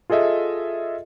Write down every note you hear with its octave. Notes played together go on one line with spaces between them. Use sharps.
F4 G#4 A4 D#5 E5